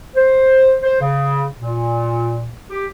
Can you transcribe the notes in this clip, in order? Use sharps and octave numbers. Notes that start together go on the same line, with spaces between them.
C5
C5
C#3
A#2
G4